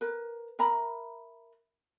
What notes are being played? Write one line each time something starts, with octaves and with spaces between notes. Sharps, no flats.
A#4 B4
A#4 E5 A#5 B5